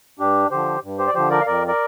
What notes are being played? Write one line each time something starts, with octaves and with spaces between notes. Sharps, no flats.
G2 D4 G4
D3 F3 G4 C5
G2
G4 C5
D5
D3 F3 G4 C5
A#4 D5
F5
F2 A#4 D5
A#4 D5